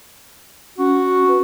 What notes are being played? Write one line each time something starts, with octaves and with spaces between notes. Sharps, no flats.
C#4 F#4
B4